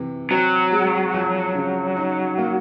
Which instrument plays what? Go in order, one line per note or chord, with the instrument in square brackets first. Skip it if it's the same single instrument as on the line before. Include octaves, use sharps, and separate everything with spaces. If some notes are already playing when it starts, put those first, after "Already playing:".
Already playing: [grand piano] C3 E3
[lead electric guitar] F#3 [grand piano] C4
[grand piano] G#3
F3
C#3
D#4
A#3